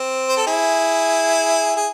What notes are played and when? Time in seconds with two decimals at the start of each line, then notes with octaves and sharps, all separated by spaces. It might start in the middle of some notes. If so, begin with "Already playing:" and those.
Already playing: C4
0.29 C5
0.37 A4
0.47 E4 G#4
1.76 G#4